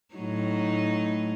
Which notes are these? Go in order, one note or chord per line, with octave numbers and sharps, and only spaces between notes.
A2 F#3 D#4